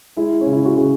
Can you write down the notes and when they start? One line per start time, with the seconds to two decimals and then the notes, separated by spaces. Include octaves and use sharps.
0.17 G#3 E4
0.41 C#4
0.46 C#3
0.53 E4
0.65 F#4
0.76 C#3 G#4